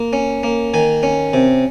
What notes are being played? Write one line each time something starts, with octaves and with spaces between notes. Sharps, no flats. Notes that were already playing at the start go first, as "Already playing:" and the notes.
Already playing: A#3
C#4
A#3
D#3 G#5
C#4
C3